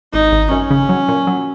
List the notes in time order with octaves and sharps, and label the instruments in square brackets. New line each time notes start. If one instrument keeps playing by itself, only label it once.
[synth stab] G#1 [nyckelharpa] D#4
[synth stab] G#1
[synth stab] F#2 [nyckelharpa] C#4
[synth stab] C#3
F#3
A#2
F#3